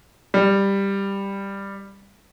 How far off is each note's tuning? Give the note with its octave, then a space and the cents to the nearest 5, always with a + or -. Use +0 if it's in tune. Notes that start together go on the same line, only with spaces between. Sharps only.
G3 +10